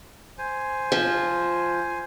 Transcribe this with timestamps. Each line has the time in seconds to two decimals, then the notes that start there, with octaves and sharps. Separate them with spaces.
0.38 C5 G#5
0.92 F3